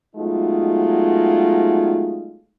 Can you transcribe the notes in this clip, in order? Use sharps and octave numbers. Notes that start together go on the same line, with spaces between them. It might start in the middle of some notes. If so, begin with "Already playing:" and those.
F#3 G#3 A3 B3 D#4 F4